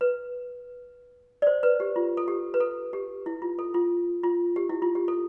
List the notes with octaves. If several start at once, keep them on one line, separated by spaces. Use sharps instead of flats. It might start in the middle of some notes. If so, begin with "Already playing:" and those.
B4
D5
C5
B4
G4
F4
A4
G4
B4
A4
G4
E4
F4
A4
F4
F4
G4
E4
F4
G4
A4